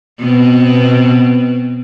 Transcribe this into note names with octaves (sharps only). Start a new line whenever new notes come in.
B2 B3 C4